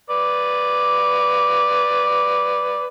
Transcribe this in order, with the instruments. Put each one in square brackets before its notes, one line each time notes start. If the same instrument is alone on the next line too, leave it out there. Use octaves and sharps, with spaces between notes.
[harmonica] B4 D5